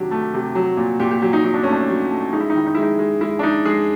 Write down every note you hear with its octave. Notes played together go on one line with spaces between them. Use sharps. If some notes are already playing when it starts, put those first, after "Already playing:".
Already playing: C3 D#3 F#3 D4 G4
A3
C3
F#3
A#2
A#2 G4
G4
F#3 G4
D#4
F#3 D#4
D4
A3 C#4
D4
F#3
A3
G#3 D#4
E4
D#4
D#3 E4
D#4
G#3 E4
D#4
G#3
G#3 E4
D4
G#3 D#4
G#3 G#4